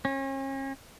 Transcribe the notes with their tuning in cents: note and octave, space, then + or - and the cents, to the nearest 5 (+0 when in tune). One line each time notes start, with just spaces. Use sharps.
C#4 -40